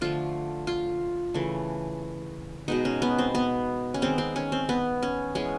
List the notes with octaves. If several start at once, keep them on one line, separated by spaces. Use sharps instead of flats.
D3 F3 A3 F4
F4
C#3 E3 A3
B2 G#3 B3 D#4
C#4
B3
C4
B3
C#4
D#3 G#3 B3 C4
C4
C#4
C4
B3
C#4
E3 G#3 B3 C#4